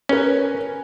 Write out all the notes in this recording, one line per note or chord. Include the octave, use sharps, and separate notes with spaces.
C#4 A#4 B4 G#5